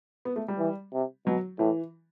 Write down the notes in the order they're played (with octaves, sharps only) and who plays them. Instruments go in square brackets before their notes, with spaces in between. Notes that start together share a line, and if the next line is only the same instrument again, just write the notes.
[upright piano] B3
A3
G3
[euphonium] E3
C3
[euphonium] B2 [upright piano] F#3
[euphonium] A2 [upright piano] E3